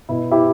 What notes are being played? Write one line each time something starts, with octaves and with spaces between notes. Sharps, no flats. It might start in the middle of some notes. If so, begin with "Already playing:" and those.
B2 E4
E4 G4